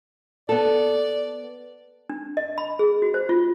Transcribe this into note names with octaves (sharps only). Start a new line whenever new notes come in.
B3 A4 D5
D4
D#5
B5
G#4
F#4
C5
F4